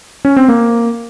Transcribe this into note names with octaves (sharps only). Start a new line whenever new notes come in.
C#4
C4
A#3